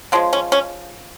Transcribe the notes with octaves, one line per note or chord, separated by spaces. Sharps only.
C#3 F3 G#3 C4
C#4
C#4